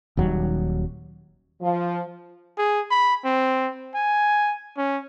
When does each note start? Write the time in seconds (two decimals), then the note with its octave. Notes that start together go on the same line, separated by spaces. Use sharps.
0.17 D#1 D#2 F#3 G3
1.61 F3
2.58 G#4
2.91 B5
3.24 C4
3.95 G#5
4.77 C#4